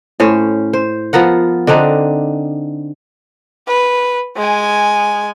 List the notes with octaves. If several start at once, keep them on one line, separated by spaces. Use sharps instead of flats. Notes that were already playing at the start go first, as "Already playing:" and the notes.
A2 C#4 C5
C5
F3 B3 A#4 F#5
D3 C4 D4 D#4
B4
G#3 G#5